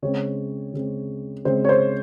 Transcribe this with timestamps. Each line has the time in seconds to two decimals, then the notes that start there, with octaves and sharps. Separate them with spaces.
0.02 C#3 G#3 C4 C#5
0.74 C#3 G#3 C4
1.45 C#3 G#3 C4 C5
1.65 C#5
1.69 C5